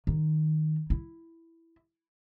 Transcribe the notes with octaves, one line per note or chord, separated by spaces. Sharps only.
D#3
E4